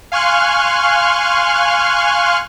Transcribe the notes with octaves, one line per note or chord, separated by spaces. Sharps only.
F5 G#5 C6 C#6 F6 F#6